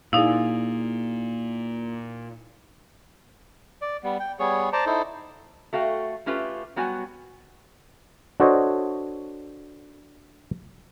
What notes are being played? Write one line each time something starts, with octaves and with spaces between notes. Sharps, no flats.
A#2 D#4 E4 G#4 D5 F5
D5
G3 B3
G5
G3 B3 G#4 C#5
C5 D5 A5 A#5
D#4 E4 A4 C5
A3 F#4 F5 G5
A3 C#4 F4 G4 B4
F#3 G3 B3 F#4 G#5
D4 F#4 A4 C5 C#5 D#5